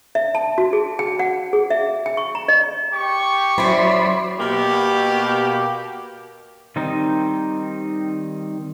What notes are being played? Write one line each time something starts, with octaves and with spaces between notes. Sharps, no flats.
E5
A5
F#4
G#4
G5
F#5
G#4
E5
G5
C#6
A#5
D#5
G4 C#6
F#3 C#4 E4 C5 D5 B5
B2 A#3 G4
D#3 G3 C4 D#4